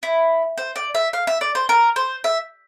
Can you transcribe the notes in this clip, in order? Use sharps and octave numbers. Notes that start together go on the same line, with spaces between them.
E4
C5
D5
E5
F5
E5
D5
C5
A#4
C5
E5